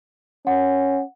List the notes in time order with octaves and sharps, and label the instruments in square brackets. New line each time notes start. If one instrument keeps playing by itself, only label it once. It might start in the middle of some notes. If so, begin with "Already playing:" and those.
[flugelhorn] C#4 [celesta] F#5